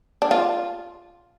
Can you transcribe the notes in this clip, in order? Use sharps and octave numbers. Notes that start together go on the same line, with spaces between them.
D4
F4